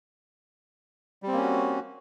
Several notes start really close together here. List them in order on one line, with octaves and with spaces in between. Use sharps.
G3 C4 A#3 C#4 F#4